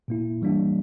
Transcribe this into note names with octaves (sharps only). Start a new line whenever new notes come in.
A#2 A#3 E4
E3 G3 A#3 D4